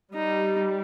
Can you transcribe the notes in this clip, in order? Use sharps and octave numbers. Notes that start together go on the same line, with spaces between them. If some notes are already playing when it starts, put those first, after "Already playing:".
G3 D#4